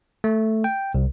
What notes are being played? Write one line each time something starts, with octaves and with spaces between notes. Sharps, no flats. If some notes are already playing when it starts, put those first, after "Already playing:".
A3
G5
C2